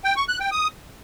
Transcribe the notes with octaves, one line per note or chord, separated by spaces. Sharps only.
G5
C#6
F#6
G5
D#6